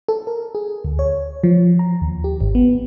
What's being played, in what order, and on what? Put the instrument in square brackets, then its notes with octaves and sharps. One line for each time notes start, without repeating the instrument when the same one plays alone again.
[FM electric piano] A4
A#4
G#4
D2
C#5
F3
A#5
D#2
G4
G#1
B3